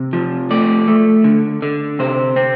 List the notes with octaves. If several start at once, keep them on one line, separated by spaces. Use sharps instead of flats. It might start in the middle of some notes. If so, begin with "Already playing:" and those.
Already playing: C3
F3
A3 D5
A3
D3
D3
C3 C5
C4